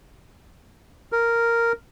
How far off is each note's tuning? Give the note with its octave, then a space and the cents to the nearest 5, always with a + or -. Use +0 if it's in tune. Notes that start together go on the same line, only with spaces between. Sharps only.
A#4 -5